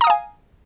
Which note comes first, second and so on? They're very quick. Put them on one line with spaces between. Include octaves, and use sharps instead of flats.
A#5 D#6 F5 G#5